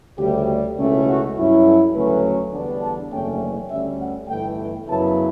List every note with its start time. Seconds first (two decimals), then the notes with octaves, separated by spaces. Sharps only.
0.18 D2 C#3 G3 G4
0.77 C#2 B2 A3 C#4 E4
1.06 F#4
1.36 G2 F#3 C#4 E4
1.65 A4
1.94 D2 C#3 F#3 A3 C#4 B4
2.53 E2 D3 G3 B3 D4
2.82 A5
3.11 F#1 E2 D3 A3 C#4 G5
3.70 D2 D3 G3 C#4 E5
3.99 F#5
4.28 G1 G2 E3 A3 G5
4.87 F#2 C#3 F#3 B3 E4 A5